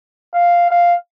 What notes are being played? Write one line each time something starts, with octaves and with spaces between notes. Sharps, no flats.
F5
F5